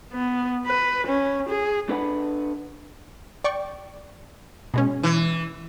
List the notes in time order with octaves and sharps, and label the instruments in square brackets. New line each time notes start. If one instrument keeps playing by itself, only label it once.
[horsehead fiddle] B3
B4
C#4
G#4
[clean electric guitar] D4 A4 B4 F#5 B5
[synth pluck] D5 G5 C#6
B2 G#3 C#4
[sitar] E3